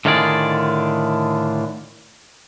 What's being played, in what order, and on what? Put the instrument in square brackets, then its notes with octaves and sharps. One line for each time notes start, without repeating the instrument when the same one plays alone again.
[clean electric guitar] A2 D3 D#3 F4 G#4 D5